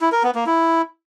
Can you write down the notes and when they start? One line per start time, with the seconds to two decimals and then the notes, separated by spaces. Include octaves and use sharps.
0.01 E4
0.12 A#4
0.23 B3
0.35 A#3
0.46 E4